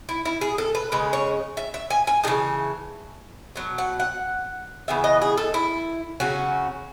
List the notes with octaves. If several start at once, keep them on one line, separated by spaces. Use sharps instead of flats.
E4
E4
G#4
A4
B4
C#3 G#3 C#4 B4
C#5
E5
E5
G#5
G#5
C#3 E3 G#3 D#4 A5
B2 F#3
F#5
F#5
C#3 E3 B3 E5
D#5
G#4
A4
E4
C#3 F#3 C#4 F#4